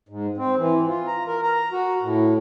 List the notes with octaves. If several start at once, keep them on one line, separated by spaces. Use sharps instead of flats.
G#2
C4
E3
F4
A#5
A#4
A#5
F#4
A2